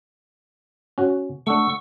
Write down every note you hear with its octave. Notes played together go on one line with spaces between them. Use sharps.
C#4 F#4
A3 D4 F#5 C#6 E6